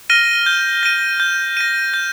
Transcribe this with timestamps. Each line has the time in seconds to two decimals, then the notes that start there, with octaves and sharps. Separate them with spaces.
0.10 F6 A#6 D#7 G7
0.46 G6
0.83 A#6 D#7
1.20 G6
1.57 A#6 D#7
1.94 G6